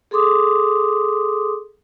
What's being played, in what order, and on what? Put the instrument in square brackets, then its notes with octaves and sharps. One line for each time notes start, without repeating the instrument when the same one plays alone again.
[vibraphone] G#4 A4 C6 D6 D#6